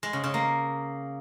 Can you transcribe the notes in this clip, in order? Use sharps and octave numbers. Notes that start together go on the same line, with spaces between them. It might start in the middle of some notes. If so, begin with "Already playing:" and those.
G#3
C#3
C#3
A#3